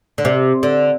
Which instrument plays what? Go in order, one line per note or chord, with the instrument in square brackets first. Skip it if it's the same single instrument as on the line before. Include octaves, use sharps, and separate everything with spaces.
[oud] D3
C3
D3